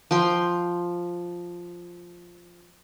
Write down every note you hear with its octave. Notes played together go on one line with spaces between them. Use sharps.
F3 G5 C6